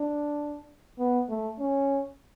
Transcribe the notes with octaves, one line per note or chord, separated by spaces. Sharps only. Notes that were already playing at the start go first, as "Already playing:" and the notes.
Already playing: D4
B3
A3
C#4